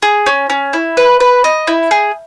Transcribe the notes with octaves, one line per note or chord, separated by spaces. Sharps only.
G#4
C#4
C#4
E4
B4
B4
D#5
E4
G#4